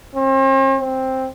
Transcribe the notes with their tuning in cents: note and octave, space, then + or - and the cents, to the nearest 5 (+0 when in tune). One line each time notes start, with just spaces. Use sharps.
C4 +45
C4 +5